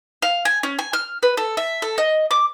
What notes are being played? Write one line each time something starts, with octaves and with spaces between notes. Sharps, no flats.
F5
G#5
C#4
G#5
F6
B4
A4
E5
A4
D#5
D6